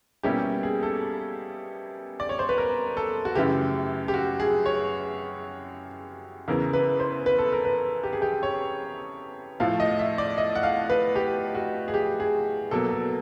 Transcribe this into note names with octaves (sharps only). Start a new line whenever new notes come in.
B2 G3 A#3 C#4 E4 G4
G#4
A4
D5
C#5
C5
B4
A#4
A4
F#4
F#2 C#3 E3 A3 G4
G4
F#4
G#4
C#5
E2 C#3 E3 A#4
B4
C5
B4
A4
A#4
B4
G4
G#4
G4
C#5
A2 F3 A3 F5
D#5
E5
D5
D#5
F#5
F5
B4
G4
F#4
G#4
G4
G#4
B2 F#3 A#3 A4
A4